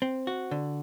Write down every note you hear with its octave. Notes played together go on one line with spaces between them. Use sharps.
C4
F#4
D3